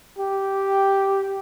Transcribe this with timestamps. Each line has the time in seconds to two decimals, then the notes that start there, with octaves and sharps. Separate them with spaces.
0.19 G4